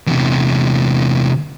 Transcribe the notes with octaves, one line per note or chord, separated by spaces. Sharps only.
E2 C3